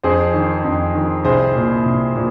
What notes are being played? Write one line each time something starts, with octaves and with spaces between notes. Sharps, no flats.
F2 G#4 C5
D#3
F2
D#3
C2 G#4 C5
A#2
C2
A#2